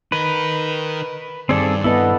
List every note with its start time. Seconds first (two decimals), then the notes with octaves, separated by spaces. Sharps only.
0.12 D#4 A#4 B4
1.49 G2 D#3 C4 G#4 A4 D5
1.84 B3 E4 A4 B4 D#5